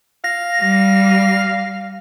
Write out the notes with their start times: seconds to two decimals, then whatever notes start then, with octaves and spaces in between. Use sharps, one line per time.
0.24 F5 A#6
0.61 G3